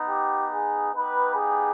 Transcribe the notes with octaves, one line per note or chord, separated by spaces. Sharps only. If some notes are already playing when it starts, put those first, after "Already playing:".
Already playing: B3 D#4
G4
G#4
B3 D#4 G4 B4
G#4